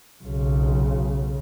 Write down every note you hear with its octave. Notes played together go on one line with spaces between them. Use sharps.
B1 C#3